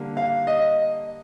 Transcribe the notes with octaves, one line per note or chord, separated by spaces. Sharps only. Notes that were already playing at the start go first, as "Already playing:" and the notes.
Already playing: D3 G3 A#3
F5
D#5